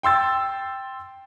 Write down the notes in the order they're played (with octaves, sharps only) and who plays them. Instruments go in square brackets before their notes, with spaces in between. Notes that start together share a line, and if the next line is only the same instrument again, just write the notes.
[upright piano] G5 C6 E6 A6